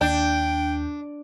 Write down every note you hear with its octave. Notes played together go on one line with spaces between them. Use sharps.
D#2 D4 G5 G6